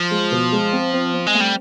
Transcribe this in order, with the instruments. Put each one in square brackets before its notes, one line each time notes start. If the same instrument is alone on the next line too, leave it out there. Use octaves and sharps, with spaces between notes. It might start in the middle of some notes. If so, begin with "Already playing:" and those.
Already playing: [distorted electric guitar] F3
[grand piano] G#3
B2
G#3
C4
C4
C4
[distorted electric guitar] G#3
[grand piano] A3
[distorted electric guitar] G3